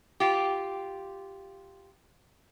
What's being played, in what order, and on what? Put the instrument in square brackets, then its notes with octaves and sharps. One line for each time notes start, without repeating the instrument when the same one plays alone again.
[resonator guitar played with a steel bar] F4 G4